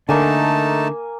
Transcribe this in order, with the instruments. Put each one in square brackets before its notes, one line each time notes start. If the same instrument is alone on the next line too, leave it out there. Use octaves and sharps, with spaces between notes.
[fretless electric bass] D3 [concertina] A3 D#4 A5 [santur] A#3 G#5